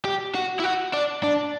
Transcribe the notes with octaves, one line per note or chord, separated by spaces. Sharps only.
G4
F#4
E4
F#4
D4
D4